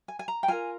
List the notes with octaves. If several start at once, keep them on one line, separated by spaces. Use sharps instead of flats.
G#5
G#5
A#5
G5
F4 A#4 G#5